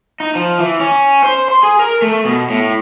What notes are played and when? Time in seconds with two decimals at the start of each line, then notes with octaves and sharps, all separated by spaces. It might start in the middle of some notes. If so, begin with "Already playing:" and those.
0.20 D#4
0.35 F3
0.60 E3
0.80 C#4
1.24 C5
1.48 C6
1.63 G#4
1.79 A#4
2.02 A3
2.25 B2
2.50 A2